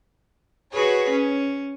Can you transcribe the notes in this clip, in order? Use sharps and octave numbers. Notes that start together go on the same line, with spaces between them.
F#4 G#4 B4 C#5
C#4